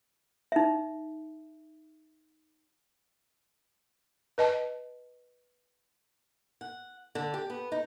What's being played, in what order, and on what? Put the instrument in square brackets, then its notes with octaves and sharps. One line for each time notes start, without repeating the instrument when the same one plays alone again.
[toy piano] D#4 E5
[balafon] B4 D#5 A5
[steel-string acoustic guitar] F#5
D3
G4
B3
D#4